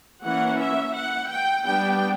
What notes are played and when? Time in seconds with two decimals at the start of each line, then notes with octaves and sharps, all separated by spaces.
0.23 E3 A#3 C#4 F#5
0.59 E5
0.95 F#5
1.29 G5
1.65 G3 B3 D4 G5